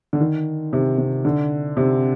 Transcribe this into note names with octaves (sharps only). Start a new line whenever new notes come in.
D3
D#3
C3
C3
D3
C3